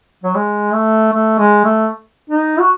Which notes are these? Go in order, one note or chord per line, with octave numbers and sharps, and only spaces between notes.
F#3
G#3
A3
A3
G#3
A3
D#4
F#4